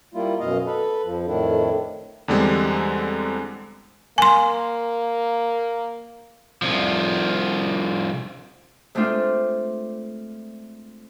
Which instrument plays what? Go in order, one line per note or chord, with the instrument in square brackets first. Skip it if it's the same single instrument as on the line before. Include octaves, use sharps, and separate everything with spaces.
[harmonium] G3 A#3 E4 F4
F#2 B2 D#5 F5
A4 B4
F2 F3
F2 A2 D#3 D4 E4
[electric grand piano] E2 D3 G3 G#3 C4
[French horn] A#3 [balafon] G#5 C6
[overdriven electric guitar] C2 F3
[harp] G#3 A3 C4 D4 F4